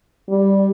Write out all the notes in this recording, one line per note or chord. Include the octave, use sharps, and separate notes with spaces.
G3